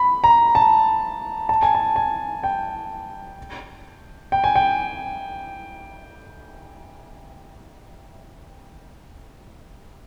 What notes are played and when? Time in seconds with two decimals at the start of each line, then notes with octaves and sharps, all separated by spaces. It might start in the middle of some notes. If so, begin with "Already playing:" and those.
Already playing: B5
0.24 A#5
0.55 A5
1.49 A5
1.62 G#5
1.75 A5
1.96 G#5
2.43 G5
4.32 G5
4.44 G#5
4.56 G5